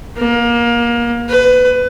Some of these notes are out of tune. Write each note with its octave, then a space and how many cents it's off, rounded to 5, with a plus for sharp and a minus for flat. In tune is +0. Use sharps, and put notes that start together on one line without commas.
A#3 +25
B4 +25